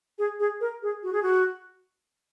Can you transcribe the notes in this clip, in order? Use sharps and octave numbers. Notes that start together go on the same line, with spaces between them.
G#4
G#4
A#4
G#4
F#4
G#4
F#4